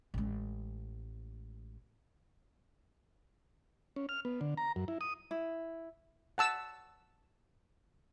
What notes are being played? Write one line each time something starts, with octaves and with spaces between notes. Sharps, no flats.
A1 G#3
C#4
F6
B3
D3
A#5
F#2
E4
D#6
E4
F#5 A5 E6